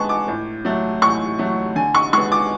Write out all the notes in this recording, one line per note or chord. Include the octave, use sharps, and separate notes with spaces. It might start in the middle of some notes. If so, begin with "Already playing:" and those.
Already playing: D3 G#3 B3 A5 C#6
D6
A2
F#3 A3
A2 C#6
F#3 A3
D3 G#5
C#6
G#3 B3 C#6
D6